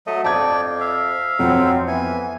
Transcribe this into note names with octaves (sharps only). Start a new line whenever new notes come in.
F#3 A3 D#5
F2 D5 G5 A5 G#6
E5 F5
F2 F#3 C4
E3 B3 G#5